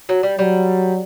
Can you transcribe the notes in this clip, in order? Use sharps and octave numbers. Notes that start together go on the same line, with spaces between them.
F#3
G3
F#3 G3